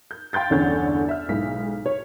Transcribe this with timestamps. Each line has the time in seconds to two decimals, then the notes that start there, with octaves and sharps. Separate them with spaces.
0.11 G6
0.33 F5 G5 C6 G6 A6
0.50 G1 E2 D3 C#4 G6 A6
1.09 E5 F6
1.29 B1 G#2 E4 B6
1.86 C#5